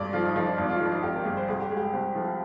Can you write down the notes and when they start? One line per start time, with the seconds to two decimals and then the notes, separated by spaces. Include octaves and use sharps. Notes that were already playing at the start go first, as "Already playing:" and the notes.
Already playing: G#1 G2 D5
0.13 F3 F4
0.25 D#4
0.36 F3 D#4
0.47 D4
0.58 G#1 D#4
0.70 F4
0.81 F3 D4
0.92 D#4
1.03 G#1 G4
1.15 A#4
1.25 G2 G#4
1.37 C5
1.48 C2 G#4
1.60 G4
1.70 G#3 G#4
1.77 G4
1.82 G#4
1.93 C2 C5
2.15 F3